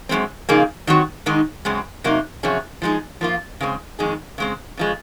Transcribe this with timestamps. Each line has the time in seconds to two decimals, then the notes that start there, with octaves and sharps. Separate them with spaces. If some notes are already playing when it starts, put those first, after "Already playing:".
0.09 F#2 C#3 G#3 C4
0.49 C#3 F3 A#3 D#4 G#4
0.87 D#3 F#3 C4 F#4
1.26 G#2 D#3 G#3 D#4
1.65 F#2 C#3 G#3 C4
2.04 C3 F#3 A#3 D#4
2.43 F2 C3 F#3 C#4 G#4
2.82 F3 G#3 D#4 G#4
3.21 F3 A#3 F4
3.61 C#3 G#3 C4
3.99 F2 D#3 G#3 D#4 G#4
4.38 C#3 G#3 C4
4.77 C#3 F3 G#3